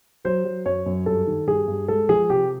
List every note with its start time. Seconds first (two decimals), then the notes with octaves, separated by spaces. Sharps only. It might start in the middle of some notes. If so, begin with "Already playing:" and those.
0.25 F#3 C5
0.44 F#3
0.65 F#2 C#5
0.86 F#2
1.06 G2 A4
1.27 D#3
1.47 G2 G#4
1.68 G2
1.88 G#3 A4
2.09 F3 G#4
2.30 C3 G4